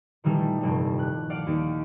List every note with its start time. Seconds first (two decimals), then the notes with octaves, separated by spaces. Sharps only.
0.24 A#2 D#3 E3 G3 A3
0.61 F1 G2 G3
0.99 F#6
1.30 D5 F5 F#5 D6
1.47 D#2